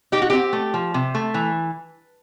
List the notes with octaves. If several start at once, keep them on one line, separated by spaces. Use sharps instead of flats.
D#4 G4
F#4
C4 G4
A3
F3
C3
A3
E3